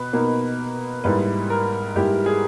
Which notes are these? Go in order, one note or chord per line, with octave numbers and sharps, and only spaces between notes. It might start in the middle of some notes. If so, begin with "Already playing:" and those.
Already playing: B2 B4
B2 A#3 D#4
G#2 G3 A#3 E4 B4
A#4
G#2 G3 A#3 E4 G4
G#4